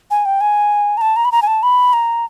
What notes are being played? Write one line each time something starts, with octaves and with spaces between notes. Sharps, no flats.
G#5
G5
G#5
A#5
A5
A#5
B5
A#5
G#5
A5
B5
A#5